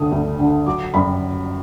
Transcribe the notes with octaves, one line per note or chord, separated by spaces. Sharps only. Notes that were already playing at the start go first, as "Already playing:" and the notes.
Already playing: D2 D3 D#6
D2
D3
F#3 D6
F#2 B5